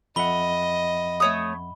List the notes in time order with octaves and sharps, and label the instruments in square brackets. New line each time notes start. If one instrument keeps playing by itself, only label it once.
[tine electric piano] F2 E5 F#5 [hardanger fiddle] D#5 [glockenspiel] B5 G7
[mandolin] A3 C#5 D#6